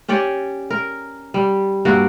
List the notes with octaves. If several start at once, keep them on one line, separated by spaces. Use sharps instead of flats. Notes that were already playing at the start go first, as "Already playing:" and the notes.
C#4 G4 C#5 D5
A#4
G3
G2 A#3 F#4